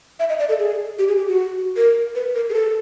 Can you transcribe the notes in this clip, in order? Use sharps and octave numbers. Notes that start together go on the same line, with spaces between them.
E5
D#5
D5
A4
G#4
G4
G#4
G4
F#4
A#4
B4
A#4
G#4
A4